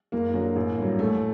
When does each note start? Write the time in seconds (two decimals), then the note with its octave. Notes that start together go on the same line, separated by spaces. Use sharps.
0.12 F#1 A#3
0.34 F#2 D3 F#3
0.56 A1
0.78 G2 D3 F#3
0.99 A1 A3